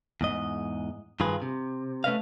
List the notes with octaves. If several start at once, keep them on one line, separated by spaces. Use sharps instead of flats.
E2 G#2 D#5
G2 D#3 F4 G#4 B4
C3
A3 C#4 B4 D#5 F5